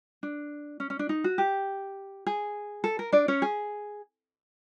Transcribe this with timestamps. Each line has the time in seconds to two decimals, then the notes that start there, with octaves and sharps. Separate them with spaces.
0.23 D4
0.80 C#4
0.90 C#4
0.99 D4
1.09 D#4
1.24 F#4
1.38 G4
2.27 G#4
2.84 A4
2.99 A#4
3.12 D4 D5
3.28 C#4 C#5
3.42 G#4